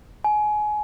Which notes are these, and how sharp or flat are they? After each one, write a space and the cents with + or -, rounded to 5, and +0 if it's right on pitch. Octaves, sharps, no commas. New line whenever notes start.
G#5 +25